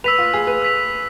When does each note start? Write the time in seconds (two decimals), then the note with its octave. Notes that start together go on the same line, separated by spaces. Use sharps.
0.04 B4 E6 B6 F7
0.18 F4
0.34 G#4
0.47 B4
0.62 E6 B6 F7